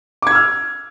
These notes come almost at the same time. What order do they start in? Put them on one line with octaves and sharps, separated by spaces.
D6 G#6 E6 F6